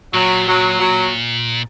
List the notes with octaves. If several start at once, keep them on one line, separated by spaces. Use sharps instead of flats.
A#2 F#3
F#3
F#3